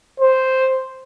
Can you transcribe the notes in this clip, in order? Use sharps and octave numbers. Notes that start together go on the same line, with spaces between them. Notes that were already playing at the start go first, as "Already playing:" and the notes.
C5